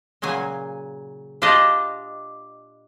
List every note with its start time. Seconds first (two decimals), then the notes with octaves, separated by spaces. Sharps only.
0.22 A#2 C#3 F#3 G#5
1.42 D4 F4 G4 D5 D#5